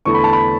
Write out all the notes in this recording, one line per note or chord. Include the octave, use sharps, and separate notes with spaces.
E2 D3 A3 E4 C#6
B5
A5
B5